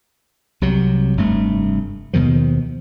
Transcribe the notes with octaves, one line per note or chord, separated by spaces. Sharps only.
C2 C3 F#3
F1 G2 A3
D#2 B2 D#3 F3